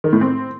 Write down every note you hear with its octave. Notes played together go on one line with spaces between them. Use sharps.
D#3
A2
C4